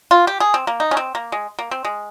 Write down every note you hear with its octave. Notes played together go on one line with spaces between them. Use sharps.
F4
G4
G#4
C4
A#3
D#4
C#4
C4
A#3
G#3
A#3
C4
G#3